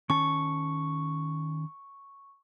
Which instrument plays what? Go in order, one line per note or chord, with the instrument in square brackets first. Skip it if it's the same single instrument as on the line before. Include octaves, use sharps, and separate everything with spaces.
[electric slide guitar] D#3 C#4 A5 [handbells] C#6